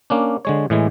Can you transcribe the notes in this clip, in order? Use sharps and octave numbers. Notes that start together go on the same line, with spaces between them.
A#3 C#4 D4
D3 G#3 C#5
A2 E3 G#3